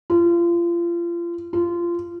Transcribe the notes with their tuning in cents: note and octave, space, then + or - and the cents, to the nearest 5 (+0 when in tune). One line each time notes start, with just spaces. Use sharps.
F4 -30
F4 -20